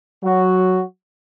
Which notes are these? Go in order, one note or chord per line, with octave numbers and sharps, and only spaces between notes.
F#3 F#4